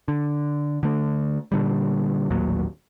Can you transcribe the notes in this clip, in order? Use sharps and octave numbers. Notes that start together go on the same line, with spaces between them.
D3
D3 A3
A#2 D3 G3
A1 D#2 A#2 F#3